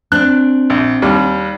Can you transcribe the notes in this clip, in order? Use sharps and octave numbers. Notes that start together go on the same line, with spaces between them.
C4 D4 F#6
A#1
D#2 G3